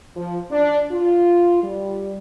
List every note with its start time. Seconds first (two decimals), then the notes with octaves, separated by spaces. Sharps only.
0.16 F3
0.51 D4
0.91 F4
1.63 G3